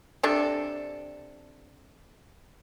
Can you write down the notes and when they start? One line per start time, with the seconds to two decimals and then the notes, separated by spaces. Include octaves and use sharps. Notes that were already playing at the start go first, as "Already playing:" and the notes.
0.23 C3 D4 A4